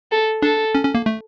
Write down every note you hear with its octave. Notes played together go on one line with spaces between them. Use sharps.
A4
D4 A4
C#4
C#4
A#3
A3